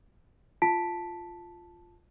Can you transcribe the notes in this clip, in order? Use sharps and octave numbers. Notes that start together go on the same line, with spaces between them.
F4 A5 B6 D7